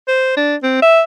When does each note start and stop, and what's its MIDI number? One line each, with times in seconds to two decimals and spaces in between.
0.08 0.36 72
0.36 0.56 62
0.63 0.78 60
0.82 1.02 76